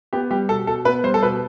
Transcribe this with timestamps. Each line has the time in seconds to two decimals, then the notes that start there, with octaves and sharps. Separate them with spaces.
0.13 B3 G4
0.31 G3 G4
0.49 B2 A4
0.67 B2 A4
0.85 B3 B4
1.04 G3 C5
1.14 A4
1.23 B2 B4